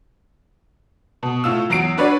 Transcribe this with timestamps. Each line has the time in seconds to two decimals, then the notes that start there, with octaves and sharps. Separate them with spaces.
1.23 B2
1.44 A2 F4 E6
1.70 E2 F#3 C7 D7
1.98 D4 F#4 B4 C#5 D5